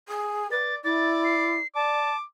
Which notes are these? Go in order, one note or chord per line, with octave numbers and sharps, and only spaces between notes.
G#4
B4 D5 A6
E4 D5 A6
C7
D5 A5 D6